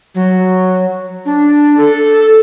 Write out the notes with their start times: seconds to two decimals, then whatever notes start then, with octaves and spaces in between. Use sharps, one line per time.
0.15 F#3
1.25 D4
1.77 A4